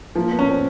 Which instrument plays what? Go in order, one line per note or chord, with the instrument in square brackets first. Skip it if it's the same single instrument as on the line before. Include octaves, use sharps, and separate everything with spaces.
[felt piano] F3 [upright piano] A#3
[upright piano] B3
[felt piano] C#4
[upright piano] C4